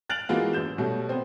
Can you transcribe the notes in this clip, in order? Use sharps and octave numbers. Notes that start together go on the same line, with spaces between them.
F6 F#6 A6 D7 F7 F#7
E3 G#3 A#3 B3 F4 F#4
A1 F#2 G6 E7
B2 F#3 G3 A3
B3 C4